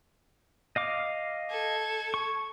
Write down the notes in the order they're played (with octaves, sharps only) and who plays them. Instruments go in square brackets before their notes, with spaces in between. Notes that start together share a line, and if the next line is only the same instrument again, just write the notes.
[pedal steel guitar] D#5 F5 D6
[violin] A4 G#6
[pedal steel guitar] C#6